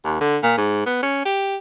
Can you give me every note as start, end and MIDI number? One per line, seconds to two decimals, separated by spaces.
0.05 0.18 39
0.21 0.37 50
0.43 0.52 46
0.57 0.86 44
0.86 1.00 59
1.02 1.20 61
1.25 1.56 67